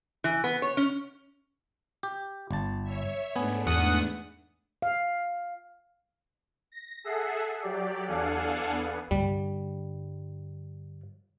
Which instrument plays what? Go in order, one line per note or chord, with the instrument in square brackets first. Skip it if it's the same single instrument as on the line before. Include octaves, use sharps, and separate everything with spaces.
[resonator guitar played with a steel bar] E3
B3
C#5
C#4
[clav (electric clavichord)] G4
G1 A5
[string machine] C#5 E5
[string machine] G#2 A3 D4 [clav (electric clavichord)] B3 G#5
[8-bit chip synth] E2 F#5 D#6
[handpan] F5
[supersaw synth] A#6
G#4 A4 E5 F#5 C7
F#3 G4 D5
E2 D4 A4 F5 F#5 G#5
B3
[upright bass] G2 D3 [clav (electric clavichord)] G3